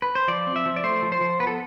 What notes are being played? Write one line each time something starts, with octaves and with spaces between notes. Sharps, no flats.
B4
C5
F3 D5
C4
E5
F3
D5
A3 C5
F3
C5
F3
B3 B4
A4